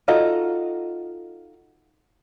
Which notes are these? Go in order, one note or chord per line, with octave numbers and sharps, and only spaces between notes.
D#4 F4 F#4 A4 D#5